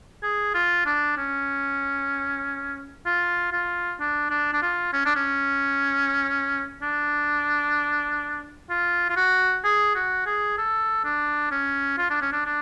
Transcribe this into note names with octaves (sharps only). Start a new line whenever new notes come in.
G#4
F4
D4
C#4
F4
F4
D4
D4
D4
F4
C#4
D4
C#4
D4
F4
F4
F#4
G#4
F#4
G#4
A4
D4
C#4
F4
D4
C#4
D4
D4